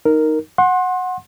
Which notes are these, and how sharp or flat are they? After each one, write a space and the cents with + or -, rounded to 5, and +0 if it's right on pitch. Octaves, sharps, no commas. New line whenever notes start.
D#4 +0 A#4 +0
F#5 -10 C6 +30